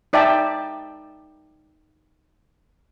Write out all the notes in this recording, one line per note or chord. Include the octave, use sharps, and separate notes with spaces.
D#4 D5 E5 G5 A5